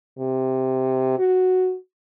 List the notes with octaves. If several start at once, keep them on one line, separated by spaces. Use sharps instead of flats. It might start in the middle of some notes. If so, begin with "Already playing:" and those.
C3
F#4